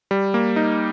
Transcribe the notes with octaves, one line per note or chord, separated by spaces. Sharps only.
G3
A#3
D#4